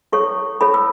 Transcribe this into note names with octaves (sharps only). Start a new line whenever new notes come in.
E4 A4 C#5 C#6
E4 A4 C#5 B5
E6